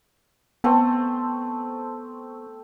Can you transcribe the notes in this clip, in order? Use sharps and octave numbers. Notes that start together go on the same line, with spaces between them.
A3 B3 C4 A4